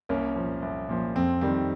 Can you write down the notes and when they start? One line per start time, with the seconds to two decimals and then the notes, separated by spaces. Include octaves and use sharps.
0.09 C2 A#3 C#4
0.36 A#2 F3
0.62 C2
0.89 A#2 F3
1.16 F2 C4
1.41 D#3 G3 C4